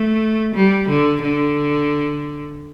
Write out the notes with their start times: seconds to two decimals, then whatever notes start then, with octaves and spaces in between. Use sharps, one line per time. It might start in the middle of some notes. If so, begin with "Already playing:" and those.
Already playing: A3
0.55 G3
0.89 D3
1.22 D3